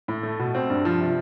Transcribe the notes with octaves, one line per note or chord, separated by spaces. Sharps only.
A2
A3
B2
C4
G2
F3
C3